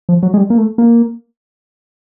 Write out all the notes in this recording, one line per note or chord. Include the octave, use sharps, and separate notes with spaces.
F3
F#3
G#3
G3
A#3
A3
A#3